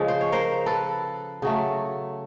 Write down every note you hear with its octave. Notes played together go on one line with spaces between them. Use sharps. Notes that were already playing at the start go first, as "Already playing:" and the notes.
Already playing: C#3 F3 G#3
C5
C#5
A#4 C5
A4 B4
C#3 F#3 A3